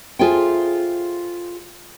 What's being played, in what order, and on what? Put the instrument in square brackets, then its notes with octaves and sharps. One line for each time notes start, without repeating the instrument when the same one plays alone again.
[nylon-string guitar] F4 G#4 A4 C5 E5 G5